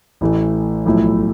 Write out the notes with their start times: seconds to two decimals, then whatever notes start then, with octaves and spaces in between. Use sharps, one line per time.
0.21 A1 A2 E3 A3
0.86 B1 A2 F3 A3 E4